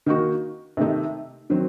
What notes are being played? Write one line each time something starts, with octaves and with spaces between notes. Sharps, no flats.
D#3 A#3 D#4 F#4
C3 D#3 A3 D#4
D#3 F#3 C4